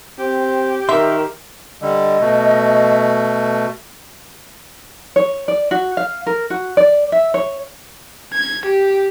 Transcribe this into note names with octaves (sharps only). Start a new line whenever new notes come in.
C4 G4
D#3 A#4 E5 A#5 C6
D3 G3 D#5
B2 A3
C#5
D5
F#4
F5
A#4
F#4
D5
E5
C#5
G#6
G4